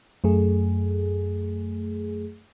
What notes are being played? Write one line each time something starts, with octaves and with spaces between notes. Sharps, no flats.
F#2 A3 G#4